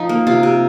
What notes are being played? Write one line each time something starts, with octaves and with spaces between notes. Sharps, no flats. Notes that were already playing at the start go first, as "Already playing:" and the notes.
Already playing: F3 D#4
A#3
C3 F4
C3